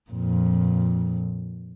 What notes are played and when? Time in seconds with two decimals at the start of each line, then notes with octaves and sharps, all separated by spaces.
0.11 F2 A#2